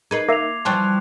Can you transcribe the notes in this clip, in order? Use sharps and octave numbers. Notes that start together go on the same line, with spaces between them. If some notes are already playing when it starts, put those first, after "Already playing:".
D#4 G#4 A#4 B4 D#5 G#6 C7
A#3 E5 D6 A#6 C7 F7
E3 F3 G3 A5 C6 C#6 F#6